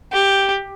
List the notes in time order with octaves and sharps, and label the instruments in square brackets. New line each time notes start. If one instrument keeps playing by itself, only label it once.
[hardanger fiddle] G4